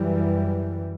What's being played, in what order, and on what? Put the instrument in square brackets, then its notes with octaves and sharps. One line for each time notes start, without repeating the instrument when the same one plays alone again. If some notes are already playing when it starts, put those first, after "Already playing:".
Already playing: [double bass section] F#2 E3 G3